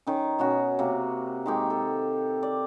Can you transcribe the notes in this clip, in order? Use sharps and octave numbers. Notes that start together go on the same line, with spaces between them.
D#3 C#4
B2 C#4 F#4
C3 A#3
D#3 G#3 G4
A4
D5